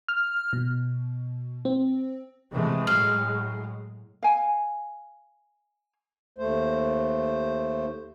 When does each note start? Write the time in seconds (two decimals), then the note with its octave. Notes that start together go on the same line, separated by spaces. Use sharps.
0.08 F6
0.53 B2
1.65 C4
2.53 C3 E3 G#3 A3
2.87 A2 F#3 F5
4.23 F5 G#5
6.38 D#2 A3 C5